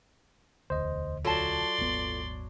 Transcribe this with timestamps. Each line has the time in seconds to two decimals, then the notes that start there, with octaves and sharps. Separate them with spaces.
0.70 E1 D2 C5 D#5
1.25 F#3 F4 A4 D5 A5 C6
1.78 D#1 G#1 B3